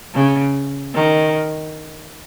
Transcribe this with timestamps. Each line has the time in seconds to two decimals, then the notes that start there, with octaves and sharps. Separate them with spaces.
0.14 C#3
0.95 D#3